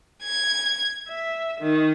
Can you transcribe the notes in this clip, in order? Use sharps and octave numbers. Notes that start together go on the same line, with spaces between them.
G#6
E5
D#3